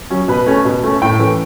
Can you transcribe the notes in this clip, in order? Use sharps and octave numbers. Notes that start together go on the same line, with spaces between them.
F#3 C#4
B2 B4
A3 C#4
B2
A3 C#4
A2 G5
E3 A3 C#4